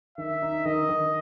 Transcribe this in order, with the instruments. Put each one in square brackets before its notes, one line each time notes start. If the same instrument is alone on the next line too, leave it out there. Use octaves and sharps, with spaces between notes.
[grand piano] D#3 [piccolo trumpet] E5
[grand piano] D#4
[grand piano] D#3 [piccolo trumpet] D#5
[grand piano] D#3